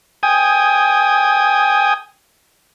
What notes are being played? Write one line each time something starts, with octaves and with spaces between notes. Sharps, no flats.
G5 G#5 D#6